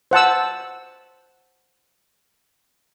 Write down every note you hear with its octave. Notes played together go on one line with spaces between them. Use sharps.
C5 F#5 A5 E6